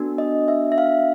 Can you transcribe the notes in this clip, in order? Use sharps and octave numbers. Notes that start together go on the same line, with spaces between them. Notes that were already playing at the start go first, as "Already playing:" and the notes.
Already playing: B3 D4 F#4 A4
D#5
E5
E5
F5